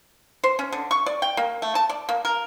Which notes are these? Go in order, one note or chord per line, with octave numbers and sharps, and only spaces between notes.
C5
C#4
D3
C#6
D5
G5
A#3
A3
A5
D5
A#3
A#4